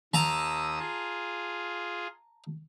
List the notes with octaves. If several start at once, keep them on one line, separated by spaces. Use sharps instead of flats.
D#2 A5 A#5 D#6 E6
F4 G#4